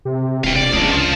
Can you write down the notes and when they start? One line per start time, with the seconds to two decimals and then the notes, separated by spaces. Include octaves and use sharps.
0.05 C3
0.44 E1 F5 G5
0.56 E1 D5
0.73 C#2 D4 G#4
0.90 F3